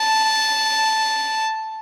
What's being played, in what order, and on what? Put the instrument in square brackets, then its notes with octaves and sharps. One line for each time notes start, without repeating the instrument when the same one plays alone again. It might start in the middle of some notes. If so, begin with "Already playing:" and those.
Already playing: [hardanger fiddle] A5